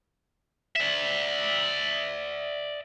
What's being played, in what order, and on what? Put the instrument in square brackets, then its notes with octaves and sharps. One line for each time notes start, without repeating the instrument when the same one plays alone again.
[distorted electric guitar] D5 E5